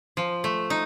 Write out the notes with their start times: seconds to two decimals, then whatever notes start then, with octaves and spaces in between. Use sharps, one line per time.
0.17 F3
0.44 A3
0.70 D#4